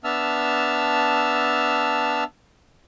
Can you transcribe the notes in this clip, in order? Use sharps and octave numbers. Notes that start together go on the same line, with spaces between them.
B3 D4 E5 A5 E6 F6